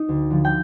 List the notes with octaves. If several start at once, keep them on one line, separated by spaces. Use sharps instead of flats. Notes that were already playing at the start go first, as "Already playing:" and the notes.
Already playing: D#4 D#5
D2
D3 F3
G5